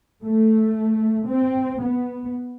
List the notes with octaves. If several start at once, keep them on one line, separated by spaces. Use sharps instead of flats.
A3
C4
B3